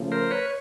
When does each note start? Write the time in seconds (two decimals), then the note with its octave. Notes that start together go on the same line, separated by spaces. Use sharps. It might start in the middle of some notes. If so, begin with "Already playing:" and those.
Already playing: C#3 F3 A3
0.12 A#4 C5
0.31 B4 C#5